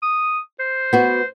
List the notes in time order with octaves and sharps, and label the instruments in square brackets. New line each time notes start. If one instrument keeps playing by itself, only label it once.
[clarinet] D#6
C5
[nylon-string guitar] B3 F#4